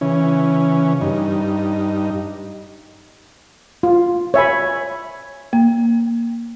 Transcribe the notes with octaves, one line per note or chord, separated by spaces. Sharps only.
C#3 E3 C#4
G2 D#4
F4
C#5 E5 G#5 B5
A#3